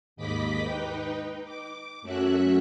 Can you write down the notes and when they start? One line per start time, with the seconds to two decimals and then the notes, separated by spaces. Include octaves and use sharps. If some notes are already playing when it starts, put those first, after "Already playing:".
0.16 D#2 G#2 D#5 B5 D6 B6
0.63 D#4 B4 G5
1.45 D6
2.01 F#2 A3 C#4 F#4 E5 F#6